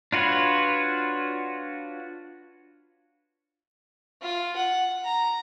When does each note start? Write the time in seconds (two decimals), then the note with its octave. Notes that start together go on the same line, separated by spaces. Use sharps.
0.12 D4 F4 F#4 B4 C#5
4.22 F4
4.56 F#5
5.04 A#5